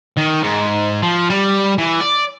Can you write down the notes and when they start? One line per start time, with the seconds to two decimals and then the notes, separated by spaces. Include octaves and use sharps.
0.17 D#3
0.42 G#2
1.02 F3
1.30 G3
1.78 E3
2.01 D5